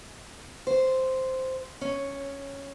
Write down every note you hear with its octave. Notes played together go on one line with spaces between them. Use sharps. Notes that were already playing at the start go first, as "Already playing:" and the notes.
C5
C#4